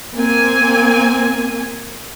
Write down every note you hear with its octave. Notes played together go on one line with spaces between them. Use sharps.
A#3 C4 G#5